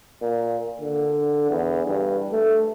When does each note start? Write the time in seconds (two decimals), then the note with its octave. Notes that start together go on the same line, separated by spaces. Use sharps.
0.22 A#2
0.80 D3
1.50 E2
1.86 G2
2.31 A3